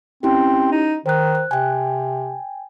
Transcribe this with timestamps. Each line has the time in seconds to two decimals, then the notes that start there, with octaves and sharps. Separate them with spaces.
0.23 C4 C#4 E4 G4
0.71 D#4
1.06 D#3 C5 F#6
1.35 F#6
1.51 C3 G5 G#5